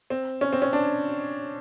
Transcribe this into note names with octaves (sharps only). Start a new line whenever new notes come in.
C4
C#4
C4
C#4
D4